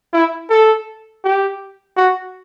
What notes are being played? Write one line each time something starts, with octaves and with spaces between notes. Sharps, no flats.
E4
A4
G4
F#4